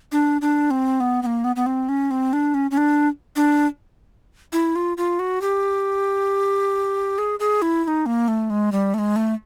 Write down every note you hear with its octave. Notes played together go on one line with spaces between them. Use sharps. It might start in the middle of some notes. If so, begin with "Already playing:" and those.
D4
D4
C4
B3
B3
A#3
B3
B3
C4
C#4
C4
D4
C#4
C#4
D4
D4
E4
F4
F4
F#4
G4
G#4
G#4
E4
E4
D#4
A#3
A3
G#3
G3
A3
G#3
A3